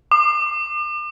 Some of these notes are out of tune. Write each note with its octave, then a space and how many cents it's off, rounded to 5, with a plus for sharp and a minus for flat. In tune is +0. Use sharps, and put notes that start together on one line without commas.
D6 +40